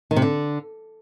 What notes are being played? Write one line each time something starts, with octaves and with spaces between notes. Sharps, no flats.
D#3
C3
D3